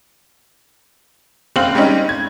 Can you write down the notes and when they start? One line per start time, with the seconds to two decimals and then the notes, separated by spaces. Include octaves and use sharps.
1.56 F#1 C4 F5 F#7
1.75 G3 G#3 C4 C#4 D#4
2.09 G#6